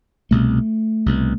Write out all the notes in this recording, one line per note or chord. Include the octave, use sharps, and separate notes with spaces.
C2 B2 A3
C2 B2